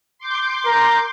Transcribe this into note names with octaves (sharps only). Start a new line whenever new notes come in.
C6 D6 G6
A#4